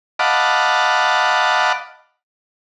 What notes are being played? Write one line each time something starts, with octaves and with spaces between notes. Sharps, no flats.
D#5 F5 F#5 A5 B5 D6